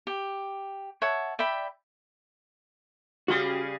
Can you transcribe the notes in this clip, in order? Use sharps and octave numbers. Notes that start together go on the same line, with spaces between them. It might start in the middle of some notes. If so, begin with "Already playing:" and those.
G4
C#5 E5 F#5 A5
D5 E5 G5 B5
C#3 G3 F#4 G#4 C6